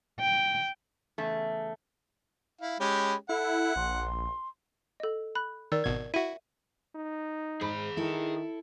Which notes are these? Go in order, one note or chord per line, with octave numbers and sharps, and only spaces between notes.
G5
E2 C#3 A3
E4 F5
G#3 C#4 G4 B5
E4 A4 F#5
A#1 C6
A4 D#5
B5 F#6
D#3 A#4 D5 E6
G#1 B2 G#6
E4 F#4 E5 D#7
D#4
G#2 G#4 B5
D#3 E4 A4